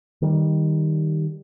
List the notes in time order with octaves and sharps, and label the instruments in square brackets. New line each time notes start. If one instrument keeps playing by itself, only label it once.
[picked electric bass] D#3 G3